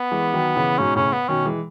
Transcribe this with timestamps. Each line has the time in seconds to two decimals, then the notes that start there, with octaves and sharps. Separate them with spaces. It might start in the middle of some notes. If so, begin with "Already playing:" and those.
Already playing: B3
0.11 E3 G#3
0.34 D#3 F#3
0.56 C#3 E3
0.78 G#2 B2 C#4
0.96 A2 C#3 C#4
1.13 B3
1.28 B2 D#3 C#4
1.46 E3 G#3